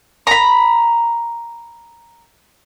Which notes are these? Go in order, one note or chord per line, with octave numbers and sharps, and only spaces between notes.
A#5 B5